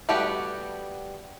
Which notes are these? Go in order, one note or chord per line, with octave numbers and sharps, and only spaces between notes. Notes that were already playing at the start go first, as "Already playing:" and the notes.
G3 A3 B3 F#4 G4